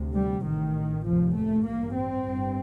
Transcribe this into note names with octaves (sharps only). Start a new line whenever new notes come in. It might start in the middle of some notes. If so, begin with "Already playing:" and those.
Already playing: D2 C3
G3
A1 A2 D#3
F1 D#2 F3
A3
A1 G2 A#3
C4
G1 G2